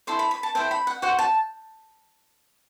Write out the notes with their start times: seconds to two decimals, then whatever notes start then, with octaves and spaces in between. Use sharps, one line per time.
0.07 E4 A4 C5 C6
0.19 B5
0.31 B5
0.43 A5
0.55 E4 A4 C5 G5
0.71 B5
0.87 F#5
1.02 F#4 C5 F#5
1.19 A5